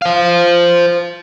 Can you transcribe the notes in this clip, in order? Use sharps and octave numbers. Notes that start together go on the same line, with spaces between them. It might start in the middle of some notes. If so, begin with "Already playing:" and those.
C5 F5